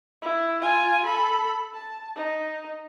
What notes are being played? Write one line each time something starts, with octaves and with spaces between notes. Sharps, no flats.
E4
F4 G#5
A4 B5
A5
D#4